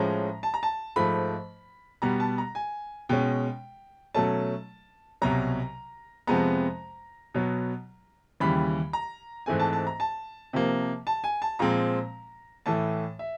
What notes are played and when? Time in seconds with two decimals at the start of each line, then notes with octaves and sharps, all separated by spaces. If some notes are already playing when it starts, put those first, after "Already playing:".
Already playing: A2 F3 G#3 C#4 A#5
0.43 A5
0.54 A#5
0.63 A5
0.96 G#2 F3 A3 B5
2.02 B2 G3 B3 A#5
2.20 A5
2.38 A#5
2.55 G#5
3.09 B2 G#3 C#4 G5
4.14 B2 F#3 A3 C#4 A5
5.22 C2 B2 F#3 A#5
6.27 F2 C3 F3 G#3 B3 A#5
7.34 B2 F#3 B3
8.40 D#2 C#3 E3 G3 B5
8.93 A#5
9.46 G#2 E3 A3 C4 G#5
9.60 A5
9.73 A5
9.87 A#5
10.00 A5
10.53 C3 F3 A#3
11.07 A5
11.24 G#5
11.42 A5
11.59 A#2 F3 G#3 C4 A#5
12.66 A2 E3 A3 A5
13.19 E5